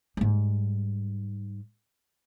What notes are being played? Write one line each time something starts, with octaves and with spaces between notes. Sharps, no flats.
G#2 G3